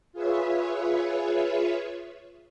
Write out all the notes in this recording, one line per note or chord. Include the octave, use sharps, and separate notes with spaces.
F4 G#4 B4 C#5 E5